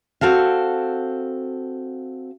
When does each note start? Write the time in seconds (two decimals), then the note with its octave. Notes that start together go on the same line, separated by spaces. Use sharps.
0.21 C4 F#4 A4 F5